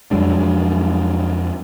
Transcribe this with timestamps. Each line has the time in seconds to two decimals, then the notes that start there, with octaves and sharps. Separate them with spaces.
0.11 F2 F#3 G#3 D4